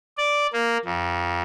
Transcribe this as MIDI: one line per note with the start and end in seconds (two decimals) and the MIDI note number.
0.17 0.47 74
0.53 0.77 58
0.85 1.42 41